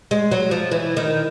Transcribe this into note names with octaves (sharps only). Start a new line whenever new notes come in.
G#3
F#3
F3
E3
D#3